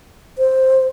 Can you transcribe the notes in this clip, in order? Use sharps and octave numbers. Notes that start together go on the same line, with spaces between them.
C5